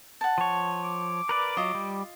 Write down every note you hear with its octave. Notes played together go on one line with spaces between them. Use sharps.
F#5 A5
F3 C#5
D6
A#4 B4 D5
F#3 F4 D#5
G3